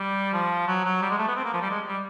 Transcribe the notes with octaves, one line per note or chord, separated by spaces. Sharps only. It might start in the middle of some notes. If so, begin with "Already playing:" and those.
Already playing: G3
F3
F#3
F#3
G3
G#3
A3
B3
C4
A#3
F3
G3
G#3
G3